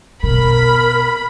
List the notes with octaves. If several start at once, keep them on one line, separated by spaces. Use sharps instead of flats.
B2 A#4 B5